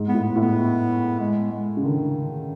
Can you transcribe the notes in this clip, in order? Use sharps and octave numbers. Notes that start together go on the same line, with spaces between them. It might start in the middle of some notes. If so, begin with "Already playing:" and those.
Already playing: G#2
B3
A2
B3
A2
B3
G#3
G#3
C#3
D3 D#3